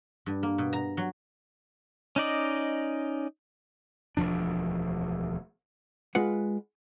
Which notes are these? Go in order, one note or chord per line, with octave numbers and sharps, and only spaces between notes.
G2
A#3
B2
A#5
F#3
C#4 D#4 D5 D#5
E1 D2 F3 D4
G#3 F4 B4 F#5